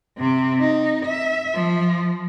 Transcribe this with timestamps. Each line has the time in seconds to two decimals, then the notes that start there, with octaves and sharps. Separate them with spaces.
0.18 C3 C4
0.61 D#4
1.06 E5
1.54 F3